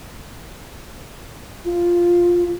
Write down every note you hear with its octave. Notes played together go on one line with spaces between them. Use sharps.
F4